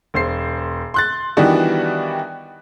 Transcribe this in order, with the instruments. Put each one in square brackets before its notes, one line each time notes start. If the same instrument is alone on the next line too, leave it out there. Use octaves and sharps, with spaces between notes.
[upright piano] E1 C5 C7
C6 F#6 A6
D#3 E3 G3 B3 D4 F#4